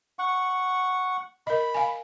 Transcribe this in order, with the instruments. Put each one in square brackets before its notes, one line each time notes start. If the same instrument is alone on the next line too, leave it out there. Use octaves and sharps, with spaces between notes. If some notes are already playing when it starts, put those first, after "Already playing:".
[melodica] F#5 C#6
[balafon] A#4 D#5 [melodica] B5
[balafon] F5 G#5